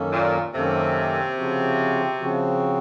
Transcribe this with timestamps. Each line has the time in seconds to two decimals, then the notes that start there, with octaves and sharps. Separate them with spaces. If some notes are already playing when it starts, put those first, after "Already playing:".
Already playing: F#2 D#3 A#3 C#4 A4
0.12 A#2
0.53 F#2 C3 D#3 A#3 C#4 A4
1.36 C#3 F3 C4 F#4
2.19 C#3 F3 C4 F#4